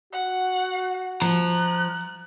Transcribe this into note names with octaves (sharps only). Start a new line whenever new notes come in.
F#4 F#5
F3 A#5 F#6